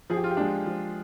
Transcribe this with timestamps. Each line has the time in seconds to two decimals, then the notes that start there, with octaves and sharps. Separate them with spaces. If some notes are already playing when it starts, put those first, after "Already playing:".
0.10 F3 G#4
0.17 G4
0.24 F4
0.31 G4
0.37 G#3 D4
0.66 F3